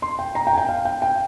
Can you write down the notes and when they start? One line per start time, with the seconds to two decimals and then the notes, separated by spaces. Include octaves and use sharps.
0.02 C6
0.19 G5
0.35 A#5
0.47 G5
0.53 G#5
0.58 G5
0.69 F5
0.85 G5
1.02 G5